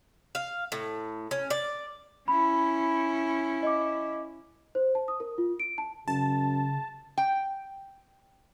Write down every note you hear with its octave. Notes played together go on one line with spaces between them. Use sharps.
F5
A2
C#4
D5
C#4 E4 B5
D#5 D6
C5
A5
D#6
A#4
F4
D7
A5
F#2 C#3 A5
G5